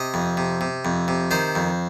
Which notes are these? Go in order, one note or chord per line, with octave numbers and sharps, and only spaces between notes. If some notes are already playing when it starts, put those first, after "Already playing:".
Already playing: C3 D#5
F2
C3
C3
F2
C3
D#3 C5
F2